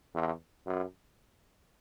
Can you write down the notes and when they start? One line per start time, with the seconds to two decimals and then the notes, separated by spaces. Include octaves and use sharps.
0.14 E2
0.66 F#2